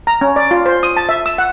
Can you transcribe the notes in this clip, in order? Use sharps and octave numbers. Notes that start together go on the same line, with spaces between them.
A#5
C#4
D5
F4
C5
D#6
A5
E5
E6
F#5